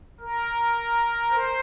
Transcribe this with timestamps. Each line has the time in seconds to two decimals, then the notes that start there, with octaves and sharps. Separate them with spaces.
0.20 A#4
1.30 C5